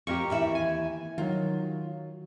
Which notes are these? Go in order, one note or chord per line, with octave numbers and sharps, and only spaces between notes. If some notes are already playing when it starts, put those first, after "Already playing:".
F2 G4 A#4 C#6
D#2 E3 E5
G#5
D#3 F#3 F4